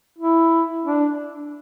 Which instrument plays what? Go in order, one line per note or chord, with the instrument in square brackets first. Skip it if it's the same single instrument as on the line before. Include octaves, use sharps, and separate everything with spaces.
[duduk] E4
D4